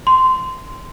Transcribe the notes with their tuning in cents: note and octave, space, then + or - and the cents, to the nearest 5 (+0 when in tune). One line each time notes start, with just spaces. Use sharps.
C6 -15